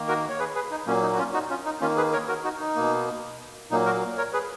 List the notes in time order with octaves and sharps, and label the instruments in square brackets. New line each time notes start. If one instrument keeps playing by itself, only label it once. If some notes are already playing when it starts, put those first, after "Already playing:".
Already playing: [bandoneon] D#3 A#3
F#4 A#4
C#5
G#4 B4
G#4 B4
D#4
A#2 F#3 A#3 C#4
D#4
F#4
C#4 F4
D#4 F#4
C#4 F4
D#4
D#3 A#3 C#4 F4
G#4 B4
A#4 C#5
F#4 A#4
D#4 F#4
D#4
B2 A#3
A#2 F#3 A#3 D#4
F#4 A#4
A#4 C#5
G#4 B4